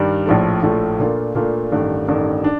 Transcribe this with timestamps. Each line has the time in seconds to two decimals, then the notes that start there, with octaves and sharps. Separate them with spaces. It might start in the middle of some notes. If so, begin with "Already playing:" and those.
Already playing: G2 D#3 G3
0.26 A#1 A2 F3 A3
0.63 A#1 A2 F3 A3
0.99 A#2 A3 D4 F4 A#4
1.35 A#2 A3 D4 F4 A#4
1.72 A1 G2 D#3 A3
2.08 A1 G2 D#3 A3
2.44 D4